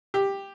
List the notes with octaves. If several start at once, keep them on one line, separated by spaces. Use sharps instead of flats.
G4